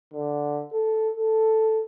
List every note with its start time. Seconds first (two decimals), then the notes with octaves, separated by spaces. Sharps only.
0.13 D3
0.72 A4
1.17 A4